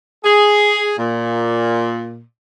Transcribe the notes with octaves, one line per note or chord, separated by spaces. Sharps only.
G#4
A#2